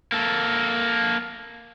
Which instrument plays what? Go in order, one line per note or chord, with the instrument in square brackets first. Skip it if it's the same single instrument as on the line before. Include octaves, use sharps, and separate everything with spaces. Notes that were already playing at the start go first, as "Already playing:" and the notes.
[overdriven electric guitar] A#3 A4